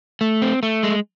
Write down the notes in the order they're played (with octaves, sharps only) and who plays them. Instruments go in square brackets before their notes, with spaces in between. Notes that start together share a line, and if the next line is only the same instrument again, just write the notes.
[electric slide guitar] A3
C4
A3
G#3